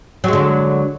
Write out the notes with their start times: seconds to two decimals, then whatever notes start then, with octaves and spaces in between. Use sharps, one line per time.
0.24 F#3
0.28 G#3
0.33 D3